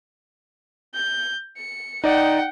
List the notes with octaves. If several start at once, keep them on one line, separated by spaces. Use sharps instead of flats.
G6
C#7
D#4 D5 F#5 G5